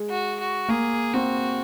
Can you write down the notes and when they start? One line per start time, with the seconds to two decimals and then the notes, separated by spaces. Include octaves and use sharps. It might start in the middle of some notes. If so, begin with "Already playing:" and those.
Already playing: G#3
0.10 F#4
0.40 F#4
0.69 A#3 G#4
1.14 C4 F#4